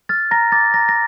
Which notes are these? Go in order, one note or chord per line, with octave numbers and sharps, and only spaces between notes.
F6 A6
A#5 A#6
D6 A6
A#5 A#6
A#6